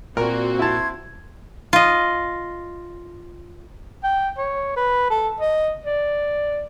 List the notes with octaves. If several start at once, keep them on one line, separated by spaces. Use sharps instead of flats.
A#2 A#3 C4 F#4 A#4 D5
E4 A5 C6 G6 G#6
F4 D#5
G5
C#5
B4
A4
D#5
D5